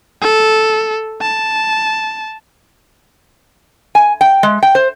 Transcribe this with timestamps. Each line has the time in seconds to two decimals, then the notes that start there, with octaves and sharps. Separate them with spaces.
0.21 A4
1.21 A5
3.95 G#5
4.21 G5
4.43 G#3
4.63 G5
4.75 C5